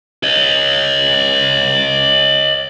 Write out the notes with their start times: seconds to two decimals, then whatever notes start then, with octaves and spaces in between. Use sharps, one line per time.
0.23 C#5 D#5